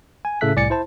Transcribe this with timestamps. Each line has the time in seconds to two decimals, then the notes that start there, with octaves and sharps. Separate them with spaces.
0.25 G#5
0.41 A2 C#3 A4 E5 F#6 B6
0.56 C2 A2 D5 G#5 A6 C#7
0.70 E4 C5 A5